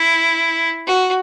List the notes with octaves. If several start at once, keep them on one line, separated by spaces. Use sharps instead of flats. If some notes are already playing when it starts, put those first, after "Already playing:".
Already playing: E4
F#4